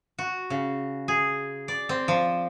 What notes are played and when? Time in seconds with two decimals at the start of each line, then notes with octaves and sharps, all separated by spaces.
0.18 F#4
0.50 C#3
1.08 G#4
1.68 D5
1.89 C4
2.08 F3